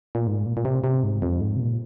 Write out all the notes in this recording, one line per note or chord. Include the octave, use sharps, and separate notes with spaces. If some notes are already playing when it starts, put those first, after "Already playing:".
A#2
G#2
A#2
A#2
C3
C3
G#2
F2
G#2
C3
A#2